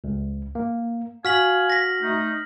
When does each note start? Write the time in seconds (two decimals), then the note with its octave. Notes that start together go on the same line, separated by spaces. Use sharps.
0.04 C#2
0.55 A#3
1.25 F#4 F5 G#5 F6 B6 F#7
1.70 A#6 B6
2.01 A3 D#4